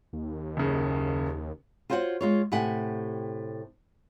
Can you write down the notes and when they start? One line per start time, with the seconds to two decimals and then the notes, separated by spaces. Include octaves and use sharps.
0.13 D#2
0.57 F#1 C#3
1.90 F4 F#4 C5 C#5 E5 F#5
2.21 G#3 F4 C#5
2.52 A2 C3 G4 F#5 G#5